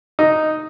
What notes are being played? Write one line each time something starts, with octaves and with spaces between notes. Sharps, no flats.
D#4